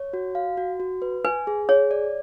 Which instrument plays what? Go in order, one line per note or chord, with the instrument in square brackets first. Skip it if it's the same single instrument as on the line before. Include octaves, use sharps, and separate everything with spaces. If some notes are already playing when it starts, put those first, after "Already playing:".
Already playing: [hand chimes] C#5
F#4
F5
F#4
F#4
B4
[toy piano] B4 [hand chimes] G#5
[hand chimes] G#4
[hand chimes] G#4 [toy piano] C#5
[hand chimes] D5